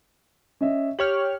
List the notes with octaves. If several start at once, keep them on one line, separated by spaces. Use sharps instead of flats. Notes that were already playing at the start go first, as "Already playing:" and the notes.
C#4 D#5 E5
G4 C#5 F6 F#7